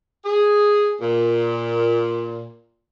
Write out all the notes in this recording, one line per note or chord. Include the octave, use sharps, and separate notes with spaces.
G#4
A#2